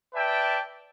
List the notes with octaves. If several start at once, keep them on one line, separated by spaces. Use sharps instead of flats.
B4 D5 E5 G5 A5